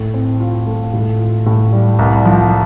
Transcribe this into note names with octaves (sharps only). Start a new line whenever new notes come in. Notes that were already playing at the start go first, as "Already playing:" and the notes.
Already playing: A2
C4
F4
A3
A2
F4
A2
G3
C2
F3